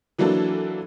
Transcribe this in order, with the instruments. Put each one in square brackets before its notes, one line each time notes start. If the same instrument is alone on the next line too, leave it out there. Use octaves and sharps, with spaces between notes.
[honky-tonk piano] E3 F#3 A#3 D4 F#4 A4